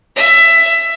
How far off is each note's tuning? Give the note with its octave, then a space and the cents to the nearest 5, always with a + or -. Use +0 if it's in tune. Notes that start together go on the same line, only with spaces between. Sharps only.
E5 +15